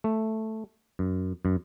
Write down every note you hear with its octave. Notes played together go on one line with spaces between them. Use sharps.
A3
F#2
F#2